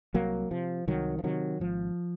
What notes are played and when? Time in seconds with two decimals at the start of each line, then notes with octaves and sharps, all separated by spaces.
0.14 C2 F#3 A#3
0.51 C3 F3
0.87 C2 D#3 F#3
1.19 F3
1.24 C3 D#3 F#3
1.60 G#1 F3